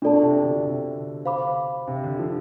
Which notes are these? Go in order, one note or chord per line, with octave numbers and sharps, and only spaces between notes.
B2 D4 F4 A4 D5 A5
C3
D3
D3
C3
C5 F5 B5 D6
C3
D3
F3